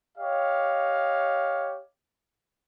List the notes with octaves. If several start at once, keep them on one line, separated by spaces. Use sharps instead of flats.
G4 C#5 D#5 F5